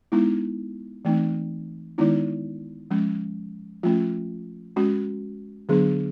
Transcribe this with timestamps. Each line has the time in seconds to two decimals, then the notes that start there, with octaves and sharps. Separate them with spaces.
0.12 G#3 B3 D#4 E4
1.05 E3 A3 C4 D#4
1.98 D#3 G#3 B3 D#4 E4
2.91 F3 G#3 C#4
3.83 F3 A3 C#4 F4
4.76 G#3 C#4 F#4
5.69 D3 F#3 B3 D4 G#4